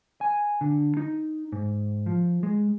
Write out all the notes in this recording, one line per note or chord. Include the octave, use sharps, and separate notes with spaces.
G#5
D3
D#4
G#2
F3
G#3